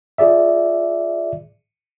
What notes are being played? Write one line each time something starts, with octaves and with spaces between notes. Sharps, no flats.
F4 G#4 D5 E5